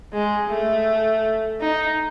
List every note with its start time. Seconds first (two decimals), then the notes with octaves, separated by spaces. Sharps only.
0.13 G#3
0.50 A3
1.61 D#4